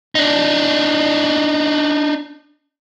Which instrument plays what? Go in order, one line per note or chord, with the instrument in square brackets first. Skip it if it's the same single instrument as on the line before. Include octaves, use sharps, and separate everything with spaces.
[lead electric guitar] D4 D#4